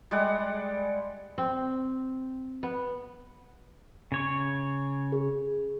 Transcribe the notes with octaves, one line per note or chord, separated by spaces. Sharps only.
G3 G#3 D5 F#5
C4
B3
C#3 C#5 C#6
G#4